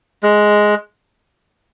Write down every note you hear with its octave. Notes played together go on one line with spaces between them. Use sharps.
G#3